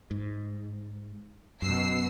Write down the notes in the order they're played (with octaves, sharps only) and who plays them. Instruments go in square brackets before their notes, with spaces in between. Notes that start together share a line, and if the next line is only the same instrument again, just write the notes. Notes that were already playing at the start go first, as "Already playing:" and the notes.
[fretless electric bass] G#2
[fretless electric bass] F#2 [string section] B2 E6 C7